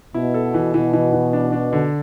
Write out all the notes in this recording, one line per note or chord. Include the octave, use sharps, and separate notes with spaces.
B2 E4
A4
E3
B2 E3
E3
E3
D4
D4
D3